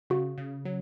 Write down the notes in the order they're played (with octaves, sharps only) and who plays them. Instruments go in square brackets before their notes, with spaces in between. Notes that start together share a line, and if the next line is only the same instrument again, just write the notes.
[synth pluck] C#3 [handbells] F#4
[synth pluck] C#3
F#3